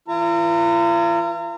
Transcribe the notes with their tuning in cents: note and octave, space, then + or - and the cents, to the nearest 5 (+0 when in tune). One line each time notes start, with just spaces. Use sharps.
E3 -20 F4 -45 A#5 -30